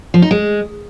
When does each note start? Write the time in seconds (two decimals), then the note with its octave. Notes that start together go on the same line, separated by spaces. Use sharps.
0.14 F3
0.22 D#4
0.31 G#3